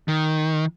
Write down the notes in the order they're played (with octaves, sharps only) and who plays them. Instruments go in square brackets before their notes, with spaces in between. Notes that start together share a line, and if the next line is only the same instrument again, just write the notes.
[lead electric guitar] D#3